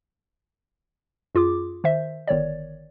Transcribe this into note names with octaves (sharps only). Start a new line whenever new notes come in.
F#2 F4 G#4 D6
D#3 C5 E5
G1 D#3 C#5 D5